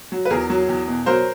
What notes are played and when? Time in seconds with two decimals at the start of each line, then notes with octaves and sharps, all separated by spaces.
0.12 F#3
0.25 B4
0.30 E2 G#4 A#4
0.50 F#3
0.69 E2
0.88 B2
1.06 F#3 A#4 C5